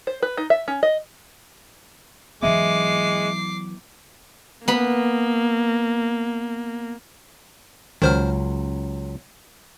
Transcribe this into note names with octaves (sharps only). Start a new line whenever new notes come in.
C5
B4
D#4
E5
C#4
D#5
E3 F#3 G#3 B3 E5 D6 C7
A#3 B3 B5
C#2 D#3 F#3 C5 F6